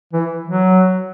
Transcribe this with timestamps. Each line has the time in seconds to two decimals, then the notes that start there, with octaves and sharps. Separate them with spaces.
0.13 E3
0.48 F#3